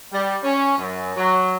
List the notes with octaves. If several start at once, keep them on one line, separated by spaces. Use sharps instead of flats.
G3
C#4
F#2
F#3